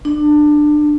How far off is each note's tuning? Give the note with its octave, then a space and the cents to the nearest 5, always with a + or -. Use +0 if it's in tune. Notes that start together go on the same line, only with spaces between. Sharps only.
D4 +20